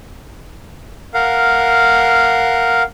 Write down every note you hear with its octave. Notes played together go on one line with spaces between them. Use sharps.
A#4 F5 F#5